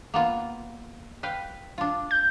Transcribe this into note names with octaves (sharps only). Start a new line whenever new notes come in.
A#3 B3 F4
B4 F5 G5
D4 F4
G6